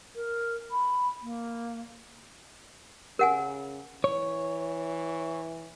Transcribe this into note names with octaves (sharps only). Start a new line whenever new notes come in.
A#4
B5
A#3
C#3 A#4 F#5 G#5
E3 C#5